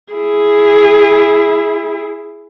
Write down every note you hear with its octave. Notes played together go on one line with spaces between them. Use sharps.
E4 G#4